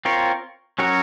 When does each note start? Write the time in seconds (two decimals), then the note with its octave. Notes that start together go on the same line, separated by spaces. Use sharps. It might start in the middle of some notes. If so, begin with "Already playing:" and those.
0.05 C4 F4 A#4 C#5
0.78 F#3 C#4 F#4 A#4 C#5